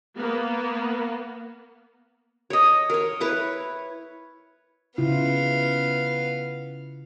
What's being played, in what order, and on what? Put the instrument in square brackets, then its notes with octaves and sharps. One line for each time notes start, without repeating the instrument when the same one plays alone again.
[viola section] A#3 B3
[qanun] C#5 D#5
A#4 C#5
E4 B4 C#5
[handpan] C#3 E4 F4 [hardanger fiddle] B3 F5